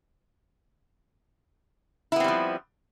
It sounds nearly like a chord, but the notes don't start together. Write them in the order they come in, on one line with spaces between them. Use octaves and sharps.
E4 B3 C4 G3 F3